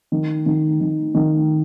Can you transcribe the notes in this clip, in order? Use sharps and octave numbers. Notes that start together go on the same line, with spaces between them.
D#3
D#3
D#3
D#3